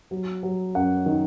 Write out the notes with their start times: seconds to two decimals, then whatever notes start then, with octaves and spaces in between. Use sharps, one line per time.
0.11 F#3
0.43 F#3
0.75 F#2 F#5
1.06 D#3